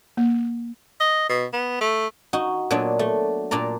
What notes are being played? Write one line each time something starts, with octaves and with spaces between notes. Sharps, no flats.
A#3
D#5
B2
B3
A3
D#4 F#4
A#2 F#3 B3 D4
A3
A#2 D4 D5 A#5